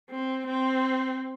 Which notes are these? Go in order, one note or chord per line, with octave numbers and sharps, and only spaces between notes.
C4
C4